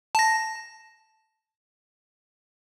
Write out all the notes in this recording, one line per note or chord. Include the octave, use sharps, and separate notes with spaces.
A5 A#6